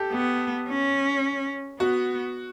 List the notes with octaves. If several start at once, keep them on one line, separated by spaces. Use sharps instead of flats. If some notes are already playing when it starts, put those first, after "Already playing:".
Already playing: G4 A4
B3 G4
C#4
B3 F#4